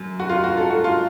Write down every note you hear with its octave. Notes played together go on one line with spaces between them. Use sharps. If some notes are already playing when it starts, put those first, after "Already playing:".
Already playing: F#2
F#4
F4
F#4
A4
F#4
F4